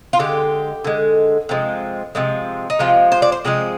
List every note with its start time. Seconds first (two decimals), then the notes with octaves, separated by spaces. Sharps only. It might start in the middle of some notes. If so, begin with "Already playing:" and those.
0.13 F4
0.19 D3 G#3 G4
0.85 D3 G#3
1.49 C3 F3 G#3
2.15 C3 F3 G#3
2.70 D#4
2.79 C3 F3 G#3 F4
3.12 C5
3.22 D5
3.32 C5
3.45 C3 F3 G#3 G#4